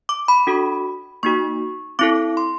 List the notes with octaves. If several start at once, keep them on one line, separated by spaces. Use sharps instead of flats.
D6
B5
D4 F#4 A4
A#3 D#4 F#4 C#6
C4 E4 A4 D6
C6